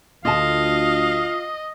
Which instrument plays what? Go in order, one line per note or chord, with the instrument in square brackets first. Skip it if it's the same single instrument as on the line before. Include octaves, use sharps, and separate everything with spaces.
[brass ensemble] D2 [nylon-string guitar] F4 A5 [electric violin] D#5 [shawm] F5